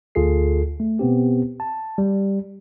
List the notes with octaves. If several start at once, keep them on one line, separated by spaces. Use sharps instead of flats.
D2 F4 G#4 A4 C7
A3
B2 B3 C4 G4
A5
G3